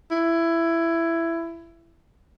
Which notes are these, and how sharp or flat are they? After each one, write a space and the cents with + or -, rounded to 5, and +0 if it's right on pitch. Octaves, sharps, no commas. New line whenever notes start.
E4 +15